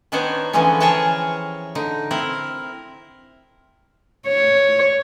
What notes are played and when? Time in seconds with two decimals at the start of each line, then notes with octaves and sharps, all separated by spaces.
0.12 D#3 B3 D4 D#4 C5 C#5
0.53 D3 E3 F3 G#3 B3 C#4
0.80 G#4 A#4 C#5 G5 A5
1.75 D3 D#4
2.11 C4 E4 A#4
4.28 C#5